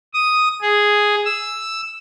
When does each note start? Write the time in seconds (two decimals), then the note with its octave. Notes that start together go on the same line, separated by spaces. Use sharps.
0.14 D#6
0.62 G#4
1.25 E6